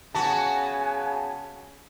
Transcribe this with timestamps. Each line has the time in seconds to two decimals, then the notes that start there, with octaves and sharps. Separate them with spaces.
0.15 C#3 B3 F#4 G#5 A5